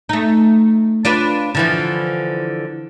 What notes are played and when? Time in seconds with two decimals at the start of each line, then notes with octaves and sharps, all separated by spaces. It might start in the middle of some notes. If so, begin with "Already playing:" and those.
0.09 A3 D#4
1.05 D4 F4 B4
1.55 D3 E3 F3